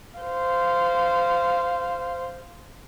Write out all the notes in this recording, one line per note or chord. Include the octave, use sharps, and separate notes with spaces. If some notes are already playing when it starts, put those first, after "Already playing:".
C5 F5